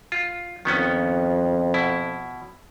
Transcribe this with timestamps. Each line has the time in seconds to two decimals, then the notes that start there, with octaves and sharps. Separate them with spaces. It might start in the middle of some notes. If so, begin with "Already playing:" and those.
0.12 F4
0.65 F2 D#3 B3 C#4
1.74 B2 E4